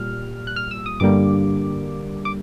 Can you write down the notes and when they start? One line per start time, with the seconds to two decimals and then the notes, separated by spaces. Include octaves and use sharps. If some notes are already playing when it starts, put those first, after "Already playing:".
Already playing: A#2 G3 F6
0.47 F#6
0.56 F6
0.71 E6
0.86 D#6
1.00 G2 D3 G3 A#3 D6
2.25 D6